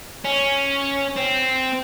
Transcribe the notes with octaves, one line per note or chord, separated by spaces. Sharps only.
C#4
C4